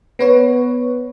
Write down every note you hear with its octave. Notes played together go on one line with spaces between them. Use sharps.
B3 B4 C#5